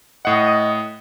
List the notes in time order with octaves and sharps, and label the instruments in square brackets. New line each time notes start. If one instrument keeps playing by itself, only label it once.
[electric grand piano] A2 F#5 [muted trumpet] D#5